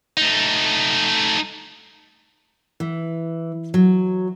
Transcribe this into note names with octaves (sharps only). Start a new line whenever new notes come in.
A3 D#4
E3
F#3